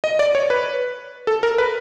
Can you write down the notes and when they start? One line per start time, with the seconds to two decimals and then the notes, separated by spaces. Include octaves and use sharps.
0.04 D#5
0.19 D5
0.35 C#5
0.50 B4
1.27 A4
1.43 A#4
1.58 B4